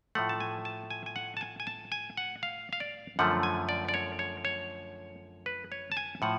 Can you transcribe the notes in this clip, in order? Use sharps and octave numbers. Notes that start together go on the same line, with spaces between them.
A2 F3 A3 F#5
A5
G#5
A5
G#5
G#5
F#5
A5
G#5
G#5
A5
G#5
F#5
F5
F5
D5
F#2 D3 F3 A3 F#5
G#5
D5
D5
C#5
C#5
C#5
B4
C#5
A5
G#5
A2 F3 F#5